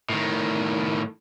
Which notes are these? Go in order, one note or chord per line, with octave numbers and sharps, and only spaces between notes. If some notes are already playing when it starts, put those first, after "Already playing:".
A2 D#3